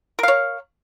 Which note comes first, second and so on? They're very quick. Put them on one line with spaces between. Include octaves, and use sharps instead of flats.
A#4 F5 C#5